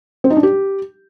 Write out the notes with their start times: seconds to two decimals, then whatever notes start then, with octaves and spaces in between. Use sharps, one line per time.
0.24 C4
0.30 D#4
0.37 D4
0.43 G4